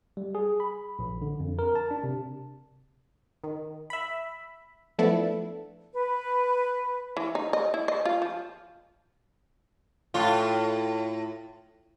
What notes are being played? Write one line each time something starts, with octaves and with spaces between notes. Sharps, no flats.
G3
G#4
B5
A#1
D3
F2
A#4
A5
D4
C3
D#3
E5 B5
F3 A3 B3 D4 E4 A4
B4
E3
D#4
D#5
E4
D#5
F4
F3
A2 F4